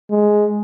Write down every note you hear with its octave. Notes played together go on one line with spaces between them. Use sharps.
G#3